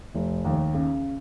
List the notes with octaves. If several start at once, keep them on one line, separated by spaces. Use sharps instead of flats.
F1
D#2
C#3